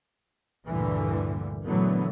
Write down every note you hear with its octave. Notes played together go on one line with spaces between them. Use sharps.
D2 G2 A#2 D3 E3 G3
A#2 D3 E3 F#3 A3 B3